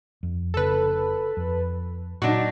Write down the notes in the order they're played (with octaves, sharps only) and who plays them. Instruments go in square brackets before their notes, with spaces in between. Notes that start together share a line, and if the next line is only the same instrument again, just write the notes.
[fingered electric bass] F2
[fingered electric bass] F1 C#3 [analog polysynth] A4 B4
[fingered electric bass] F2
[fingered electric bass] A#2 [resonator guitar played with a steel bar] F#3 D4 D#4 [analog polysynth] F#4